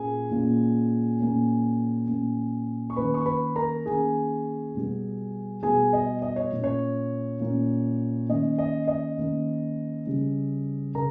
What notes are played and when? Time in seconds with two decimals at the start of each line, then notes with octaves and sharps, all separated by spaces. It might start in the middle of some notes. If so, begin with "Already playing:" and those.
Already playing: A#2 A#3 C#4 G#4 G#5
0.31 A#2 A#3 C#4
1.20 A#2 A#3 C#4
2.08 A#2 A#3 C#4
2.90 C#6
2.96 D#3 A#3 C#4 B4 B5
3.14 C#6
3.26 B4 B5
3.56 A#4 A#5
3.86 D#3 A#3 C#4 G#4 G#5
4.74 B2 G3 B3
5.62 B2 G3 B3 G#4 G#5
5.93 D#5
6.22 D#5
6.36 C#5
6.51 A#2 A#3 C#4
6.64 C#5
7.40 A#2 A#3 C#4
8.29 D#3 A#3 C#4 D#5
8.58 D#5
8.88 D#5
9.18 D#3 A#3 C#4
10.06 C#3 G3 C#4
10.95 C#3 A#4 A#5